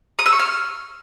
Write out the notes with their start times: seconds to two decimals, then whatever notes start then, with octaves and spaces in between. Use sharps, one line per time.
0.19 D#6
0.26 E6
0.33 C#6
0.39 F6